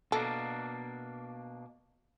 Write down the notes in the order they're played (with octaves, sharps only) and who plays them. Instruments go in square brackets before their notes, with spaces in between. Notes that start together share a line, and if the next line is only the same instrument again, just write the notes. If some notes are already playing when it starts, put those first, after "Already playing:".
[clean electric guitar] B2 A#3 D4 [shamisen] A4